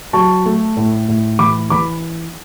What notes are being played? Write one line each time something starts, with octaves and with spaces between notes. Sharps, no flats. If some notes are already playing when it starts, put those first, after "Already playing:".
F#3 A5 C#6
A3
A2
A2
E3 B5 D6
E3 B5 D6